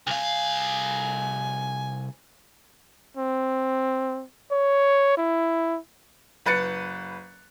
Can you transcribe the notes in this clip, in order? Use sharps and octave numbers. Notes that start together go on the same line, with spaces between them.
C2 F5 G#5
C4
C#5
E4
F#1 B4 F#6 A6 C#7